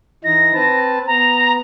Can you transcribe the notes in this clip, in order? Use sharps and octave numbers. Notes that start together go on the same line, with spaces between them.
E3 D#4 A#6
C4 B4 A5
B3 A#5